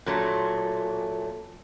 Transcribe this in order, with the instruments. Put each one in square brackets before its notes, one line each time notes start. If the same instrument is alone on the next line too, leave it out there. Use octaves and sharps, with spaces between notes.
[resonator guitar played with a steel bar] A#2 F#3 A3